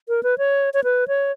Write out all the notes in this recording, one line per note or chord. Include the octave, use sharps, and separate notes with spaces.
A#4
B4
C#5
C#5
B4
C#5